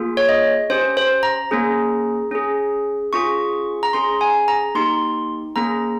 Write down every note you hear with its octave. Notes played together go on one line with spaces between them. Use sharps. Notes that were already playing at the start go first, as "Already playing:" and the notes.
Already playing: A#3 F4 G#4
C#5
D#5
C#4 G4 C5
C5
A#5
A#3 C#4 G#4
C#4 G#4
C#4 F4 G#4 C#6
A#5
C#4 G#4 C6
G#5
A#5
A#3 D#4 G4 C6
A#3 C#4 G#4 A#5